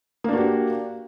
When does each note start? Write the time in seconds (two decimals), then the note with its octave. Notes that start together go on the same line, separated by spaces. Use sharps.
0.24 A#3
0.29 D4
0.33 F#4
0.37 G4